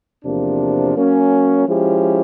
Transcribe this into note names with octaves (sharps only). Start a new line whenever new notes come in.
E2 C3 F3 A#3 D4
F#3 A#3 C#4
F3 G#3 C#4 E4 G4